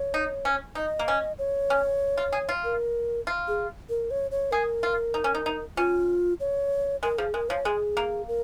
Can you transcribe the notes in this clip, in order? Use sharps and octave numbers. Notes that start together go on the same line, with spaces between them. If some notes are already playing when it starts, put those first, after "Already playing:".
Already playing: C#5
D#4
C#4
D#4 D#5
A#3
C#4
C#5
C#4
F4
G#4
F4
A#4
F4
G#4
A#4
C#5
C#5
G#4 A#4
F4
D#4
C#4
D#4
D#4
C#4 F4
C#5
G#3 A#4
F3 G#4
G#3 A#4
F3 C#5
G#3 G#4
A#3
A#4